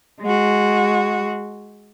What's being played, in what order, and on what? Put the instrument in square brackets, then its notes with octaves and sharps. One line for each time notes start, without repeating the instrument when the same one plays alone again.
[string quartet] G#3 F#4